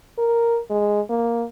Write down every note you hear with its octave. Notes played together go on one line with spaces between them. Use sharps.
A#4
G#3
A#3